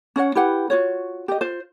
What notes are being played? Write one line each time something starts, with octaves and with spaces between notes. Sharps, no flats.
C#4 C#5 D#5 F#5
E4 G4 B4 F#5
F4 F#4 C#5
G4 D#5
F4 C5